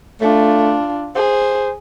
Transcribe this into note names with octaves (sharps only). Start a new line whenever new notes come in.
A3 D4 F4
G#4 C5